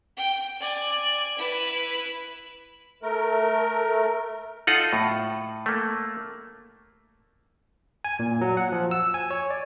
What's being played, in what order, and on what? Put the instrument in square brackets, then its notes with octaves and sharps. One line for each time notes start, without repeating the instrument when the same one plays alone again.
[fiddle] G5
D5 G#5
E4 B4
[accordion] A3 A#4
[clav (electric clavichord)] D#4 F4 A4 D#5 F#5
A2
A3 A#3
[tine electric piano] G#5
A#2
F#3
F#5
F3
E6
G#5
C#5
D5